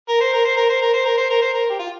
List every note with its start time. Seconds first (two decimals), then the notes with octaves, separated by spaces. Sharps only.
0.09 A#4
0.20 C5
0.33 A#4
0.44 C5
0.57 A#4
0.69 C5
0.82 A#4
0.93 C5
1.05 A#4
1.17 C5
1.30 A#4
1.41 C5
1.54 A#4
1.70 G4
1.79 F4